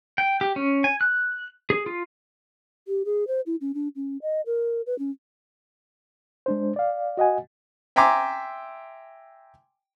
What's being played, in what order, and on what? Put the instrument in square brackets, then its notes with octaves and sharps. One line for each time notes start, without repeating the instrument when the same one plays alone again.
[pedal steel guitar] G5
G4
C#4
G#5
F#6
G#4
F4
[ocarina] G4
G#4
C5
E4
C#4
D4
C#4
D#5
A#4
B4
C#4
[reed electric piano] G#3 D4 C5
D5 F5
F#4 D#5 F#5 G#5
[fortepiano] E5 G5 G#5 A#5 C6 D6